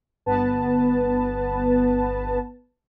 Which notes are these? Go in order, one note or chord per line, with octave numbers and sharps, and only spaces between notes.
G1 B3 B4 A5